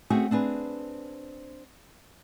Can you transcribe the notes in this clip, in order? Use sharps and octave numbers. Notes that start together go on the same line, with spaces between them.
A3 C4 C#4 F#4 G#4
C4 D4 G#4 B4